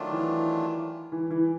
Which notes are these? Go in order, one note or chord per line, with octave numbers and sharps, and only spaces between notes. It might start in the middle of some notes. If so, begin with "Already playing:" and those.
Already playing: D#3 F#3 A3 D4 F4
E3
E3
E3